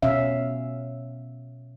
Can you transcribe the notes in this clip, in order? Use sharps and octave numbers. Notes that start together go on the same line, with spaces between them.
B2 C#4 E5 F5